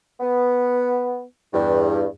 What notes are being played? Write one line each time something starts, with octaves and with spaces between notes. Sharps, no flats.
B3
E2 G2